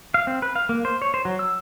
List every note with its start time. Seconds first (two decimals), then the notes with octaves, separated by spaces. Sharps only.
0.14 F5
0.27 C4
0.42 B4
0.56 F5
0.69 A#3
0.85 C5
1.02 C#5
1.14 C5
1.25 F#3
1.39 E6